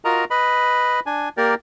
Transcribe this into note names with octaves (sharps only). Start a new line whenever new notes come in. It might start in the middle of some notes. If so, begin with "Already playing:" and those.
F4 F#4 A#4 D#5 A#5
B4 D#5 B5
D4 G#5
A#3 G4 A#4 D5